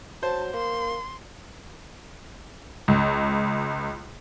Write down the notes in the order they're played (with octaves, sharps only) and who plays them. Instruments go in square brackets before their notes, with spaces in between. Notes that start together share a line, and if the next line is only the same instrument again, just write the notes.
[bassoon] F#3 [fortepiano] C5 [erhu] A5
[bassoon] A#3 [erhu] C6
[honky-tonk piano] C#2